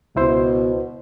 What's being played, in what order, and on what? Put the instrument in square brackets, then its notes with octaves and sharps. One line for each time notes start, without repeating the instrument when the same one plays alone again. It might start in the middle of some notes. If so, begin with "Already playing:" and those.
[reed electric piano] C#2 E4 C5 [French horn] B2